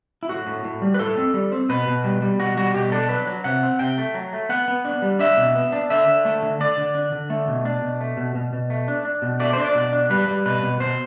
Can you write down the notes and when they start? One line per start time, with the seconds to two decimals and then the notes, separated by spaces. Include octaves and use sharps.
0.23 E4
0.29 A2 F#4
0.47 A2
0.65 A2
0.82 G3
0.94 B4
0.99 A2 A4
1.18 C4
1.34 G3
1.52 C4
1.69 B2 B4
1.88 B2
2.04 G3
2.22 G3
2.39 B2 F#4
2.57 G3 F#4
2.74 B2 G4
2.92 D4 A4
3.09 F#3 B4
3.27 F#3
3.44 C3 F#5
3.63 C4
3.79 C3 G5
3.98 A3
4.14 F#3
4.33 A3
4.49 B3 F#5
4.68 B3
4.85 D4
5.02 G3
5.19 D4 E5
5.37 B2
5.55 B3
5.72 D4
5.90 D3 E5
6.08 D3
6.25 A3
6.43 D3
6.61 D3 D5
6.77 D3
6.95 D4
7.12 D3
7.30 A3
7.48 B2
7.65 D4
7.82 B2
8.01 A3
8.17 B2
8.35 B2
8.53 B2
8.70 A3
8.88 D4
9.05 D4
9.22 B2
9.40 A3 D5
9.53 D4 C5
9.65 D5
9.75 B2
9.93 D4
10.10 G3 B4
10.28 G3
10.46 B2 B4
10.63 B2
10.80 B2 C5